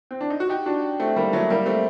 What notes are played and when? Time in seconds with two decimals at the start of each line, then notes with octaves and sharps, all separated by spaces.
0.11 C4
0.21 D4
0.30 D#4
0.40 F#4
0.49 D#4 G4
0.66 D4 F#4
0.99 A3 C4
1.16 G3 A#3
1.33 F#3 A3
1.50 G3 A#3
1.66 A3 C4